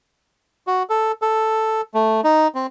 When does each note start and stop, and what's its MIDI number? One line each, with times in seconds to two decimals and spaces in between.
0.67 0.83 66
0.90 1.12 69
1.22 1.81 69
1.94 2.21 57
2.24 2.48 63
2.55 2.66 60